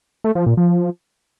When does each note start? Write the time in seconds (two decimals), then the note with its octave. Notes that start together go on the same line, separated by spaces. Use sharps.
0.24 A3
0.35 F3
0.46 A#2
0.57 F3